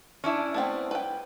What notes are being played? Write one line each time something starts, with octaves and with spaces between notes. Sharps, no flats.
C#4 D4 E4
A3 B3 C4
B4 G5